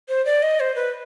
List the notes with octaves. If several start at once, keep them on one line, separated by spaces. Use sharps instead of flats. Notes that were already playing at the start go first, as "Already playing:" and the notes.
C5
D5
D#5
C5
B4